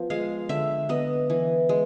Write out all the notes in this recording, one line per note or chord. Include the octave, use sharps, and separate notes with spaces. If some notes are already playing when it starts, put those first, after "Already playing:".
Already playing: F3 B3
G#3 F5
D3 E5
B3 D#5
E3
G#3